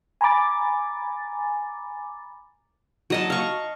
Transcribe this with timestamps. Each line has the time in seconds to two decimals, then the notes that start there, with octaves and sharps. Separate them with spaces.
0.21 G#5 A#5 B5 D6 A6
3.10 F#3 D#5 A5
3.30 F5 C#6